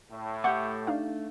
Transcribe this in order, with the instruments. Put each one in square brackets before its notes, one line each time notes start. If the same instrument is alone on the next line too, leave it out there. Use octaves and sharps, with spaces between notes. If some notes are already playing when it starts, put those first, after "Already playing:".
[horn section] A2
[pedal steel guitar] A3 C#6 D6 [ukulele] G4 F#5 [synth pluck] G6
[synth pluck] D4 D#4 F5